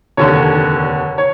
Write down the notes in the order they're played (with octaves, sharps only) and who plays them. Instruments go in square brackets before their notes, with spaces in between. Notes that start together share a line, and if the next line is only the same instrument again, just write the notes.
[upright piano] F1 D#2 D3 C#5
C#5